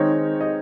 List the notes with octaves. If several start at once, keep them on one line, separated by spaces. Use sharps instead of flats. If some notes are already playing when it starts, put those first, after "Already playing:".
Already playing: D#3 G#3 C4 D#4 C#5
D#5